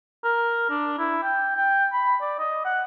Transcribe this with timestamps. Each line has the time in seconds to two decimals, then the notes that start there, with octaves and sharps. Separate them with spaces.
0.24 A#4
0.70 D4
0.99 E4
1.23 G5
1.56 G5
1.93 B5
2.21 D5
2.39 D#5
2.65 F#5